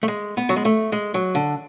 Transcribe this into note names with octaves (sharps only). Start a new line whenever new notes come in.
A3
G#3
B3
F#3
G#3
A3
G#3
F#3
D3